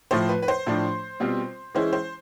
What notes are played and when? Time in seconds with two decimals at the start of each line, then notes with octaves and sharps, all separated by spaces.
0.11 A2 F3 A3 C5
0.29 B4
0.42 B4
0.48 C5
0.66 A2 F3 A3 D4
1.20 B2 G3 C4 F4
1.75 E3 G#3 C#4 E4 C5
1.93 C5